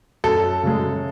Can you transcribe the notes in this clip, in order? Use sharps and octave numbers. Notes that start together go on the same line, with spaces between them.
F#2 A4
C#3 G#3